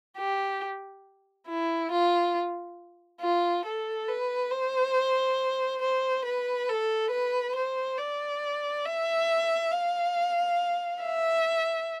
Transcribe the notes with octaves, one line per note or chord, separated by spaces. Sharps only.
G4
E4
F4
F4
A4
B4
C5
C5
B4
A4
B4
C5
D5
E5
F5
E5